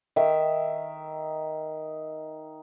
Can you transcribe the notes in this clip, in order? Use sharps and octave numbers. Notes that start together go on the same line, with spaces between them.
D#3 D#4 E5